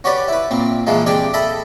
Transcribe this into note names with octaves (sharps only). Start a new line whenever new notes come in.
C#4 F#4 G4 B4 D5
E4 B4
A#2 C4
A#2 E3 F3 G#3 A#3
C4 D4 G4 G#4 G5
A4 D#5 E5 B5